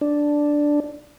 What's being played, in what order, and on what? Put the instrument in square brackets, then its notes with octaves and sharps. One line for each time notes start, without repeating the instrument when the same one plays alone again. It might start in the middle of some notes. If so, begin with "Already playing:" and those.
[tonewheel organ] D4